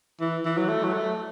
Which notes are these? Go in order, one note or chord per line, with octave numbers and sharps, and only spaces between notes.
E3
E3
F#3
A3
F#3
A3